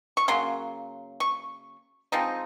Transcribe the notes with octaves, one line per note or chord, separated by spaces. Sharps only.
C#6
C#3 F#3 A#3 C6
C#6
F3 G#3 C4 D#4